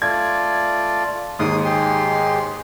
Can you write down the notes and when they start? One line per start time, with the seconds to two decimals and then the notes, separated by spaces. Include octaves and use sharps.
0.02 A3 F4 D5 G#6
1.39 D#2 G#2 C6 D#6
1.65 G#3 G4 C6